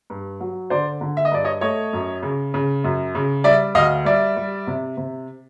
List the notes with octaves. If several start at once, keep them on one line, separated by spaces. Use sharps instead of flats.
G2
F#3
D3 C5 D5
D3
E5
D#5
G2 D5
C#5 D#5
A3 C#5 D#5
F#2
C#3
C#3
F#2
C#3
G3 D5 E5
D2 D#5 F5
G3 D5 E5
G3
C3
C3